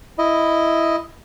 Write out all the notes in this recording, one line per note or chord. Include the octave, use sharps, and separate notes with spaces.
E4 D#5